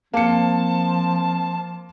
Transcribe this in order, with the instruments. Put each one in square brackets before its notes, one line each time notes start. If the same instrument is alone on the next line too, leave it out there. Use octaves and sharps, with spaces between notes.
[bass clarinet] F3 [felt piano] A#3 C#7 [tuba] C4 [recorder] A5